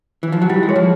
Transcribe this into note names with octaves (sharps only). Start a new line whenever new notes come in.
E3
F3
F#3
G3 E4
G#3
G#4 C#5
F3